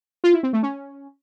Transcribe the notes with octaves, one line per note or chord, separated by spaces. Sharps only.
F4
E4
C4
A3
C#4